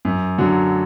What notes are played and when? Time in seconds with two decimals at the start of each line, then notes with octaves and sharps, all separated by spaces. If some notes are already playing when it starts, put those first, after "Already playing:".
0.05 F#2
0.38 D3 F#3